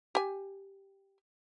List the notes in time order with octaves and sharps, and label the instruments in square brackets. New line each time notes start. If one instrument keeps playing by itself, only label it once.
[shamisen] G4 G#5